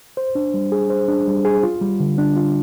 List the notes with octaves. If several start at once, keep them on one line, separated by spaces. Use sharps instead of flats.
C5
D4
G3
G#4
C5
D4
G3
G#4
F4
G3
D3
D4
F4